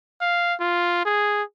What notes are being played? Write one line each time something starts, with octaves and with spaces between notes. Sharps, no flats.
F5
F4
G#4